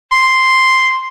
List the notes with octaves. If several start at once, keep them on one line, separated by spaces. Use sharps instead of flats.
C6